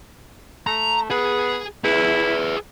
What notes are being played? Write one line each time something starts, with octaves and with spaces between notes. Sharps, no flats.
A3 A#5
B3 G#4
E4 G#4 B4